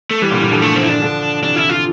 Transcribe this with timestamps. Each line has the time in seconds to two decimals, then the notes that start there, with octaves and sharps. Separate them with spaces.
0.11 A3
0.22 E3 G3
0.31 A#2 D3
0.42 G2 A#2
0.51 D3 F3
0.62 A3
0.76 C4
0.83 E4
0.89 D4
1.02 D3 F3
1.43 C3 E3 D4
1.56 E4
1.69 F4